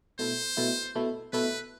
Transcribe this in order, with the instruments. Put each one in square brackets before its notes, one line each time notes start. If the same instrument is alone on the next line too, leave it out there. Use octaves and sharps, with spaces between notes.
[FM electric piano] B2 A3 E4 [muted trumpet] C5
[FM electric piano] B2 A3 E4
B2 A3 E4
[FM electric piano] B2 A3 E4 [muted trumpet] B4